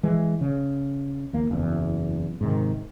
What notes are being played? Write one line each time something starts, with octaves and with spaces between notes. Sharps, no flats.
E3 G#3
C#3
D#2 A#3
F#1 E2
G#2 C3 D#3